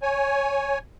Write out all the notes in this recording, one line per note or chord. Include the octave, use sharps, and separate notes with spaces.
C#5 G#5